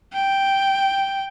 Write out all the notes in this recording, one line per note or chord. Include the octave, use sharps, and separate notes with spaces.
G5